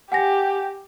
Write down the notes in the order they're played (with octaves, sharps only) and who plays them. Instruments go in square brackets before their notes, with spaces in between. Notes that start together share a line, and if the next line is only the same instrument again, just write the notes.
[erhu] G4 [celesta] F#5 G#5 A#6